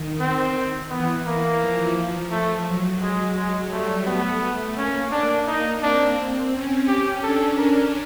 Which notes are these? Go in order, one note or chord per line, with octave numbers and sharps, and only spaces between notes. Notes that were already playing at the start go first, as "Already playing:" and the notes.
Already playing: D#3
C4
E3 B3
A#3
F3
A3
F#3
F#3 G#3
G#3
G3 A3
A3 B3
A3
A#3 C#4
A#3 D4
D#4
C4 D4
C#4
G4
D4 A4
A#4